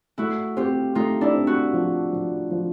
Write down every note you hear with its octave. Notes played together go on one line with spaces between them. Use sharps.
A3 E4 F#4
C4 F4 G4
A3 D#4 F4
D4 E4
C4
E4 F#4
F3
F3
F3